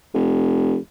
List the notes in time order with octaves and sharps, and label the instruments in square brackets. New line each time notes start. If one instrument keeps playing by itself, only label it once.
[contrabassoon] F1